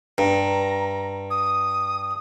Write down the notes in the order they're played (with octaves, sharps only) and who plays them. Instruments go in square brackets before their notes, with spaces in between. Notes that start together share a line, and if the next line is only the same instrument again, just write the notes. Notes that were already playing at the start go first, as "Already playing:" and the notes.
[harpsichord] G2 [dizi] A#5
[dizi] D#6